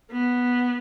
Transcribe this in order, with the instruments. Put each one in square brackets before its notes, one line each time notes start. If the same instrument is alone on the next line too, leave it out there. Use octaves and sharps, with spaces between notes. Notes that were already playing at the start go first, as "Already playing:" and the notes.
[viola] B3